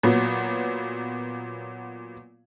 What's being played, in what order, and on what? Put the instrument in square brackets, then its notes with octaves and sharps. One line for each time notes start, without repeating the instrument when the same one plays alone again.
[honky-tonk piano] A#2 F#3 B3